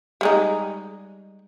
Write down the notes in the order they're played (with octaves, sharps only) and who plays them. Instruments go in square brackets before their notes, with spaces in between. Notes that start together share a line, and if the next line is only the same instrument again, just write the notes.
[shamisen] G3 G#3 D#4